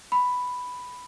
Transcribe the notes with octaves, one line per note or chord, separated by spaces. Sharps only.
B5